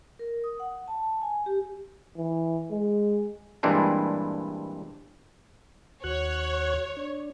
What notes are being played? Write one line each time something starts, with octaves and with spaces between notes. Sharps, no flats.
A#4
D#6
F#5
A5
G#5
G4
E3
G#3
G2 A#2 E3 G#3 C4 D4
D#2 F#4 C#5 F#6
D4